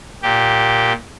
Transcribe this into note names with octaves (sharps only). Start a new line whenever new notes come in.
A#2 G4